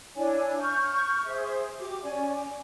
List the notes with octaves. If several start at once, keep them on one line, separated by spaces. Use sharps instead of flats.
D4 E4 C#5 G#5
C#6 F6 G6
G#4 C5 E5
F#4 G4 D6
C#4 D5 G#5
D6